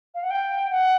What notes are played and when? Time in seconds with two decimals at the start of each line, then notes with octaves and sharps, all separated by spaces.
0.14 F5
0.23 F#5
0.30 G5
0.71 F#5